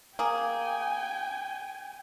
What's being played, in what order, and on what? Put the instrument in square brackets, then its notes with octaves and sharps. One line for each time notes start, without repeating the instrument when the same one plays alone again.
[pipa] A#3 G#4 [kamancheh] G5 G#5